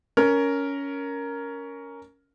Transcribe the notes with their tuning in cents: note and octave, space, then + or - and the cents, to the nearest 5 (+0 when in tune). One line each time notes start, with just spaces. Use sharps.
C#4 +15 A#4 +0